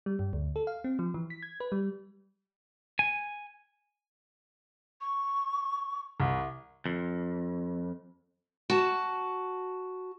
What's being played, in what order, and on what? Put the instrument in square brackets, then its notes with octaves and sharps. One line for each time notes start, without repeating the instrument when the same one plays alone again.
[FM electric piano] G3
G2
D2
A4
F5
C4
F3
E3
B6
G#6
B4
G3
[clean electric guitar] G#5
[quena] C#6
[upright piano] C2
[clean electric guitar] F2
[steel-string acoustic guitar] F#4 A5